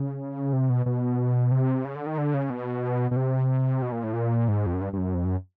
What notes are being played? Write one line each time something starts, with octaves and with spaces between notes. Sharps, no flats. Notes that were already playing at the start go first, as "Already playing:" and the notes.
Already playing: C#3
C3
B2
B2
C3
C#3
D3
D#3
D3
C#3
B2
B2
C3
B2
A#2
A2
A#2
G#2
F2
F#2
G2
G2
F#2
F2
F#2